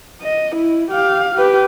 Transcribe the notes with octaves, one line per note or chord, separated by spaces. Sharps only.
D#5
E4
G4 F5
G4 B4